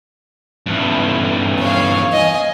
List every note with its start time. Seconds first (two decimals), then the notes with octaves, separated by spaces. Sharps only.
0.66 E2 G2
1.59 C#5 F5
2.13 D#5 G#5